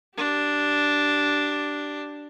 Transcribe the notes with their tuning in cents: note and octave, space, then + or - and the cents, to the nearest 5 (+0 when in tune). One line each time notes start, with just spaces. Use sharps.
D4 +0 G4 -20